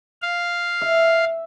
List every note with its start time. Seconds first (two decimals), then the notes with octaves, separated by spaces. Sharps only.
0.22 F5
0.81 E5